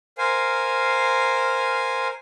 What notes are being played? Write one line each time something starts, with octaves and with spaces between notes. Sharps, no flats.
A#4 C5 F5 G#5